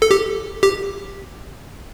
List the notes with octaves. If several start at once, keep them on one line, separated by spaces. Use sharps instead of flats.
A4
G4
G4